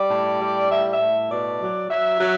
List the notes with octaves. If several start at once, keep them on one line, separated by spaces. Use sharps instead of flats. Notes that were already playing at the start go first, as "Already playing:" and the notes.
Already playing: G3 D5
A2
G3
A2 E5
E5
A2
B2 D5
F#3
F#3 E5
F#3